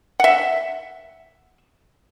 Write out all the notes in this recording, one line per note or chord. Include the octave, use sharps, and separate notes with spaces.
E5 F#5